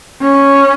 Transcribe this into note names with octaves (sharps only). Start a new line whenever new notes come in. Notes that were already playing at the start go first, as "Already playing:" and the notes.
C#4